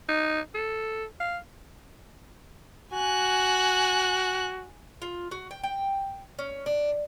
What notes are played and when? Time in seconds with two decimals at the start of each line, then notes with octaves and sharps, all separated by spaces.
0.09 D#4
0.55 A4
1.20 F5
2.93 F#4 G#5 F#6
5.02 F4
5.31 F#4
5.51 G5
5.63 G5
6.39 C#4
6.66 D4